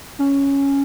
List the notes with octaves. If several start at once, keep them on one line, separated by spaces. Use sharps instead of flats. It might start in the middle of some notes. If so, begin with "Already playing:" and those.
C#4